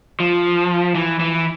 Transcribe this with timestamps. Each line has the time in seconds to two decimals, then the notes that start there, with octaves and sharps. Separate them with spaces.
0.20 F3
0.95 E3
1.20 E3